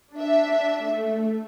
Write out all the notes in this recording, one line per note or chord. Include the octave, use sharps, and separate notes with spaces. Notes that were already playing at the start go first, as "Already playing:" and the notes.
D4 E5
A3